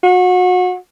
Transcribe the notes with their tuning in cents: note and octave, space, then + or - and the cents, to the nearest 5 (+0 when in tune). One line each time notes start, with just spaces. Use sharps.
F#4 -30